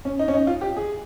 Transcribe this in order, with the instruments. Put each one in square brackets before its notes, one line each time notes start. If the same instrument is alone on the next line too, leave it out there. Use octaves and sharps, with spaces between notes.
[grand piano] C#4
D#4
C#4
D#4
F4
G4
G#4